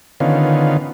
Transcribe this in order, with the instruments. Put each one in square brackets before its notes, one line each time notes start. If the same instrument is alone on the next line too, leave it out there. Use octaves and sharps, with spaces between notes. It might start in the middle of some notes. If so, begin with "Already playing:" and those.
[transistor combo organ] D3 D#3 B3 C#4 F4